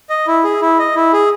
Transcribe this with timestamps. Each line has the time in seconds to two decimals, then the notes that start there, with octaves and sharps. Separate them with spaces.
0.10 D#5
0.28 E4
0.44 G#4
0.62 E4
0.78 D#5
0.96 E4
1.13 G#4